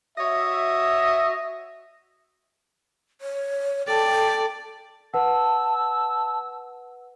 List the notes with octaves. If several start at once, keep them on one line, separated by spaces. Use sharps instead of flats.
F#4 C#5 D#5 E5
C#5
A4 D5 G5 A5
B4 F#5 A5 E6